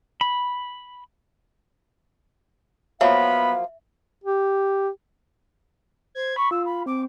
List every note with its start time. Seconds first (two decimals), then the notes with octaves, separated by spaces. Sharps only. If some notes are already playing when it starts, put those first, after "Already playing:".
0.21 B5
3.01 F3 F#3 A#3 B3 E5 F5 B5
4.24 G4
6.15 C5 G#6
6.36 B5 C#6
6.51 F4 E6
6.65 B5
6.86 C4 D6